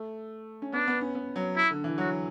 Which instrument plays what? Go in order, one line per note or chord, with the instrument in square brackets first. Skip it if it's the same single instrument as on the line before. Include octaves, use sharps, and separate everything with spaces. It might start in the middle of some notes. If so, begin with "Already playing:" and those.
Already playing: [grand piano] A3
C#4
[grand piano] B3 [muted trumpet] D4
[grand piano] B3
C#4
B3
F#3
[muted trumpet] E4
[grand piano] D3
E3
[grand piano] F#3 [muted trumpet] F#4